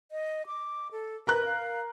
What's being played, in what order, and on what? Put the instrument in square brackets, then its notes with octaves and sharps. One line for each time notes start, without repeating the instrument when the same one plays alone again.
[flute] D#5
D6
A4
[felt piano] A#4 A#5 F#6 [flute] B4
[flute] F5